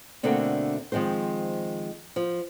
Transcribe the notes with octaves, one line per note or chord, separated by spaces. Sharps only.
B2 D3 A3 A#3 C4 D4
D#3 F3 G#3 C4 C5
F3